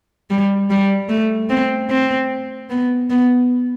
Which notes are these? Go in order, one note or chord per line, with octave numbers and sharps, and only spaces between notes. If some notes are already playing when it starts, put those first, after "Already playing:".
G3
G3
A3
C4
C4
B3
B3